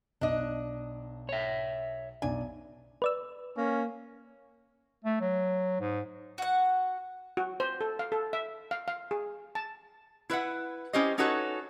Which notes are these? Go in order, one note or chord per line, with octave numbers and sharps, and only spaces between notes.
B1 D4 D#5
C#5 E5
B1 D4 G#5
B4 D5 E6
A#3 C#4
A3
F#3
G#2
F#4 F#5
F#4
C5
A4
F5
A4
E5
F5
F5
G#4
A5
E4 B4 E5 F#5
C#4 E4 G4 C5 D#5
C#4 D#4 F#4 A4 B4 C#5